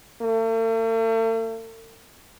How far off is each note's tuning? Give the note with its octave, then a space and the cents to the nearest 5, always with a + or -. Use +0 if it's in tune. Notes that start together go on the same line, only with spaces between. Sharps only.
A3 +45